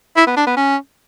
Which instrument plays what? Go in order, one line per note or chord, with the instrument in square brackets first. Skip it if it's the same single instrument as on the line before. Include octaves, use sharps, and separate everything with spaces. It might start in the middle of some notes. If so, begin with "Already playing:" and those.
[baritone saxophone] E4
B3
D4
B3
C#4